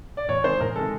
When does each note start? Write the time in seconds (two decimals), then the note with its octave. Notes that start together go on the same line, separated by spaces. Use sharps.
0.17 D5
0.29 E2 C#5
0.44 C3 D#3 G#3 C5
0.60 E2 A#4
0.76 C3 D#3 G#3 A4